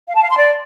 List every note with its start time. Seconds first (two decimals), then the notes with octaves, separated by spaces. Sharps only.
0.07 F5
0.14 A5
0.21 F5
0.29 C6
0.36 D5